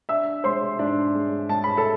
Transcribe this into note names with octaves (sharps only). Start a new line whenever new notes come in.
D4 E5 E6
G#3 C5 C6
G#2 D4 D5
G#3
G#3 A5
B5
A4 A5